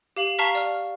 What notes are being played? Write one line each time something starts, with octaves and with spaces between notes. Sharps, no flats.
G4 F5 F#7
F5 A5 A#5 C#6 F6 B6
D5 F6